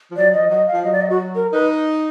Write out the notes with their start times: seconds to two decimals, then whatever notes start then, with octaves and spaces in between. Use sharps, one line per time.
0.11 F3
0.16 F#3 D5
0.33 F3 D#5
0.50 F#3 D#5
0.67 F5
0.72 F3
0.84 F#3 D#5
0.93 D5
1.01 D#5
1.10 F#4
1.35 A#4
1.52 D#4 B4